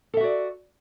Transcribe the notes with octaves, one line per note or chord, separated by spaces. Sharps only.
F#4 A4 D5 E5